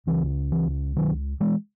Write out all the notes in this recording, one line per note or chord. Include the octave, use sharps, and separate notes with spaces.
C#2 C#3 E3
E3
D#3 F#3
E3 G#3